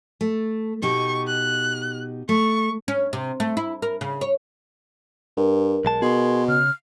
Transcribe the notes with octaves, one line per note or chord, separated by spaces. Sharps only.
A3
B2 D#4 G4 C#6
F#6
A3 C#6
C#4
C3
A3
E4
A#4
C#3
C#5
G2 A#4
B1 G#3 A5
B2 G#4 C6
C#3 F6